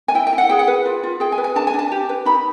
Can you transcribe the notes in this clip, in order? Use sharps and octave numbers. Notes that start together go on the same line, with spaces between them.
G#5
E4 G5
G5
E4
F#5
G#4 G5
F#5
B4
F4
F4
G#4 G5
G#5
B4
G#5
D4 A5
G#5
D4
A5
G4
B4
D#4 B5